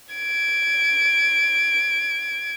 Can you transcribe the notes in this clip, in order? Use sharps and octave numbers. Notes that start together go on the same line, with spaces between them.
G#6 D7